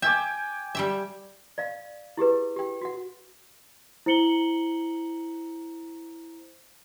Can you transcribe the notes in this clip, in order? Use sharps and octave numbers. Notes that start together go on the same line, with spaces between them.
E5 G5 G#5 D6
G3 G4 E5
D5 F5
E4 G4 G#4 B4
G4 G5
F#4 F#5
E4 C5 A#5 C#7 F#7 G7